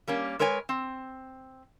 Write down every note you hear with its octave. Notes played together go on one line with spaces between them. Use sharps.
G3 A#3 C#4
G#3 A#4 B4 C#5 G#5
C4